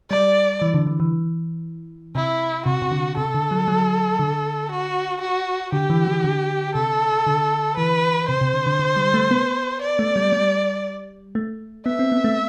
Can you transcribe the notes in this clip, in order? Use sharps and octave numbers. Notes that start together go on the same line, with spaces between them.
G3 D5
E3
D3
E3
E3
C3 E4
C3 F#4
C3
D3
C3 A4
D3
F#3
F#3
D3
F#4
F#4
D3 G4
E3
E3
D3
C3 A4
D3
E3 B4
C3 C5
C3
D3
D3
D3
G3
A3
B3
D5
A3
G3
G3
A3
B3 E5
C4
B3
A3